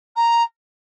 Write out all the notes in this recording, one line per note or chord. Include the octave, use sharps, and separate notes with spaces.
A#5